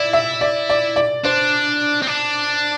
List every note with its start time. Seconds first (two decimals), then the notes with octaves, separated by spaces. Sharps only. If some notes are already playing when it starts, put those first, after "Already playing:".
Already playing: E4 D5
0.13 E5
0.41 D5
0.70 D5
0.96 D5
1.24 D4 C5
2.02 C4
2.07 D4